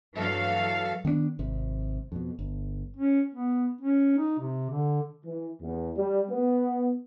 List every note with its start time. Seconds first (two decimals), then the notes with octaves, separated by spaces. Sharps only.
0.17 G2 E3 F#3 A4 F5
1.05 D#3 B3 C4 D4
1.39 G#1 C3
2.12 F2 B2
2.39 G1
2.97 C#4
3.35 B3
3.81 C#4
4.18 D#4
4.39 C3
4.70 D3
5.24 E3
5.62 E2
5.96 G3
6.29 B3